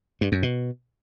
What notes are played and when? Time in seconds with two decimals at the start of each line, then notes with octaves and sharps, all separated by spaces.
0.21 G2
0.32 F#2
0.43 B2